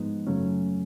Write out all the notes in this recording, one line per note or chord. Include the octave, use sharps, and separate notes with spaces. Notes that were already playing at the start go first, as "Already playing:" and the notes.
Already playing: G#2 F3 G#3 B3 D#4
F#2 C#3 F#3 A3 C#4